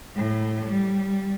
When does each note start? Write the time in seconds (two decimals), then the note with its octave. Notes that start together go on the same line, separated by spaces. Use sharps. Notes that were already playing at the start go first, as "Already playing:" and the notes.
0.16 A2
0.65 G3